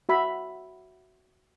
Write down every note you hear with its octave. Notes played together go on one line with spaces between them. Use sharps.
F#4 E5 B5